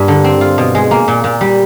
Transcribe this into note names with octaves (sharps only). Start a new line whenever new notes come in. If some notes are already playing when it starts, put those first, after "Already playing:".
Already playing: G2 G3 A#3
D3
C4
F4
B2
G#3
A#3
A#2
A#2
G3